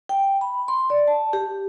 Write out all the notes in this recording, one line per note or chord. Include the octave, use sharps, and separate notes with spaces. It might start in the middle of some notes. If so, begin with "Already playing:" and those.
G5
B5
C6
D5
A5
G4